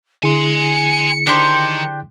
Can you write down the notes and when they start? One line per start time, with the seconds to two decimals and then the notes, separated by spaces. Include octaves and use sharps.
0.23 D3 E4 G#4 G#5 C6 C#7
1.27 D#3 D4 G4 C5